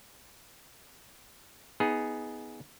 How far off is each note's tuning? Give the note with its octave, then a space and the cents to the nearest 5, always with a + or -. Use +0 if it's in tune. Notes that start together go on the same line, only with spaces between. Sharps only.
B3 +0 D#4 +25 G#4 +0